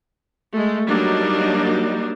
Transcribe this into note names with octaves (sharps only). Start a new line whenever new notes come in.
G#3 A3
F#3 G3 A#3 D4 D#4